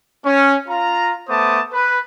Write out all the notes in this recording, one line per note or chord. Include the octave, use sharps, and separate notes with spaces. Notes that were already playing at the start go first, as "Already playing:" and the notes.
C#4
F4 A#5
A3 B3 C5 A5 D6 D#6
B4